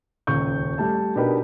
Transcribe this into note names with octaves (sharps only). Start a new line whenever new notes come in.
D#1 C#2 C#6 G6
G3 A3 A5
B2 D4 D#4 G4 A#4 B4